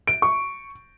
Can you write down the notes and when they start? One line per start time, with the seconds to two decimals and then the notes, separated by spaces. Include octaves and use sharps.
0.07 D7
0.22 C#6